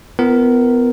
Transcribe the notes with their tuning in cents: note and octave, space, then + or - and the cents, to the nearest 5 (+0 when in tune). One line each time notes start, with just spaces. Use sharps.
B3 +25 F4 -40 A#4 +0